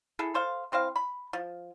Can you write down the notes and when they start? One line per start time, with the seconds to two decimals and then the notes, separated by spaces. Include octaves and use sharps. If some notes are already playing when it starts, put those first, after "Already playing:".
0.19 E4 G#4 A4
0.34 A4 C5 F5
0.72 E3 C4 C5 F5
0.96 B5
1.33 F3